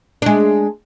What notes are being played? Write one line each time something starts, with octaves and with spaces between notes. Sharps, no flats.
G#3 D4